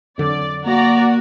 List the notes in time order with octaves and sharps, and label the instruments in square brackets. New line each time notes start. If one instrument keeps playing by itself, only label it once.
[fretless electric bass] F2 D3 F#3 [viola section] D5
[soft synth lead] A#3 [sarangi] F#4 [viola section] D5 A#5